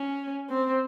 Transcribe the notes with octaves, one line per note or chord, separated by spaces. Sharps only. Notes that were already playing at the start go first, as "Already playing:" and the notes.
Already playing: C#4
C4